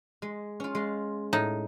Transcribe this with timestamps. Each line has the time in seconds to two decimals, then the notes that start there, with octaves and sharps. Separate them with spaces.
0.22 G#3
0.60 C#4 F4
0.75 G#3 F4
1.33 A2 D#4